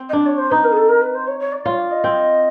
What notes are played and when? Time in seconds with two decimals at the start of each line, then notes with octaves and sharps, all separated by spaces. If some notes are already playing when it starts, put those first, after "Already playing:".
Already playing: C4
0.09 D#5
0.13 D4 D5
0.26 C#5
0.38 C5
0.51 D#4 B4
0.64 A#4
0.72 G#4
0.77 A4
0.89 A#4
1.02 B4
1.14 C5
1.27 C#5
1.40 C#5
1.53 D5
1.65 F4 C#5
1.79 D5
1.91 D#5
2.04 C4